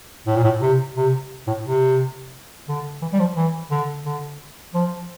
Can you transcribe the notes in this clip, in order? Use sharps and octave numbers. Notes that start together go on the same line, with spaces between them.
A2
A#2
A2
C3
C3
A2
C3
D3
E3
G3
F3
E3
D3
D3
F3